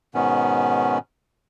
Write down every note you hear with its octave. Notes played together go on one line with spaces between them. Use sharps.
G#2 B2 D#3 B3 C#4